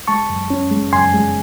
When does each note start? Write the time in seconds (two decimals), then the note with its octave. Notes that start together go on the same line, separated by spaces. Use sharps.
0.08 G#3 A5 C#6
0.30 F#2
0.50 C#4
0.71 G#3
0.93 F#2 G#5 C6
1.14 G#3